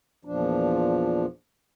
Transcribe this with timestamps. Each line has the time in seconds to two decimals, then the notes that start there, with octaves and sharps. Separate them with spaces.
0.25 E2 A#2 F3 D4